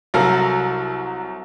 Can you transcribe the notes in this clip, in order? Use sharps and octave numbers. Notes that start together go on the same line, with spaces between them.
C2 F#3 A4 A#4 F5 A#5